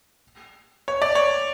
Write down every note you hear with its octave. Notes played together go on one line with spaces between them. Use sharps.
C#5
D5
C#5